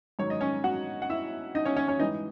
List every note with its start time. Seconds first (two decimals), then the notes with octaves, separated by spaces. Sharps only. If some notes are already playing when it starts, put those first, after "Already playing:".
0.19 G#2 D#3 F#3 C#5
0.30 D#5
0.40 C#4 C#5
0.64 F#4 F#5
1.02 F#5
1.10 E4 E5
1.55 D#4 D#5
1.65 C#4 C#5
1.76 C#4 C#5
1.88 C#4 C#5
1.99 G#2 E3 D#4 D#5